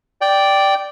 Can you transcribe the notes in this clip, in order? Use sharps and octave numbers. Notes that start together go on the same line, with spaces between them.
D5 G5